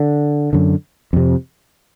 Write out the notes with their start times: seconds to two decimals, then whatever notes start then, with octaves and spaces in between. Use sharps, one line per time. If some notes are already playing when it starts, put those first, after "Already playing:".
Already playing: D3
0.53 F#2 D3
1.13 F2 C3